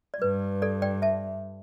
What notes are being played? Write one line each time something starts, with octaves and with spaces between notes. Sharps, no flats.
D5
G2 B4
A4 D5
D5 G5
E5 A5